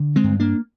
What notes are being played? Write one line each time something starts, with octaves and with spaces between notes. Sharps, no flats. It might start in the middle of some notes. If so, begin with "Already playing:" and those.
Already playing: D3
G#3 C4
G2
A#3 D4